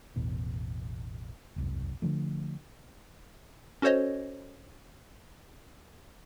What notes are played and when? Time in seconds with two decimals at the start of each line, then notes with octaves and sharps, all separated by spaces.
0.16 A1 E2 B2
1.56 E1 C2 F#2
2.02 D3 D#3 F3 A3
3.82 C#4 F#4 A4 C5 C#5 D#5